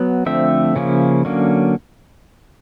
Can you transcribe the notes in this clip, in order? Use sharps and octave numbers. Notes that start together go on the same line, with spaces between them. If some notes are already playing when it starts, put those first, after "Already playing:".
Already playing: F#3 B3
D3 F3 A3 C4 E5
C#3 F3 A#3 C#4
D3 F#3 A#3 C#4